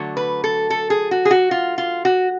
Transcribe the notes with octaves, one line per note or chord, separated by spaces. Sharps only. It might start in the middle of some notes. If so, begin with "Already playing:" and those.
Already playing: D3 F#3 A3
B4
A4
A4
G#4
F#4
G#4
F#4
F4
F4
F#4